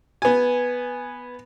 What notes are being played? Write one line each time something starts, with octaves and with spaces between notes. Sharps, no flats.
B3 G#5